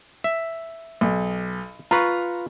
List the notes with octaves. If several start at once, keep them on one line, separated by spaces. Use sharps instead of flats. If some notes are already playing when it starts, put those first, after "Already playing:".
E5
B1
F4 B4 A#5 C#6